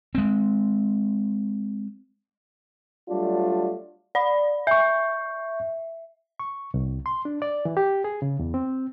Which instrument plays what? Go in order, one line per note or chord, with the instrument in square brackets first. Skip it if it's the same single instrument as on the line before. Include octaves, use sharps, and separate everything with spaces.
[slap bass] G#3 C4
[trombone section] F#3 G3 A3 D4 F4
[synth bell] D5 B5
[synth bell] E5 [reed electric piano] C#6 G6
[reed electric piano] C#6
C2
C6
D4
D5
E3
G4
G#4
C#3
E2
C4